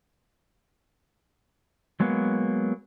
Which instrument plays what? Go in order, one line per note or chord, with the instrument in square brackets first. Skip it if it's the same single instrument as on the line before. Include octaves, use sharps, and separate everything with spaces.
[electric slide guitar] F#3 G#3 A#3 B3